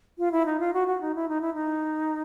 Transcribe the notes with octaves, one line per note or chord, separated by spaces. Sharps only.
F4
E4
D#4
F4
F#4
F#4
D#4
E4
D#4
E4
D#4